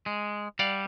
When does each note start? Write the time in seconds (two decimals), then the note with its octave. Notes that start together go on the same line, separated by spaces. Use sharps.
0.06 G#3
0.59 G3 D5 F5 F#5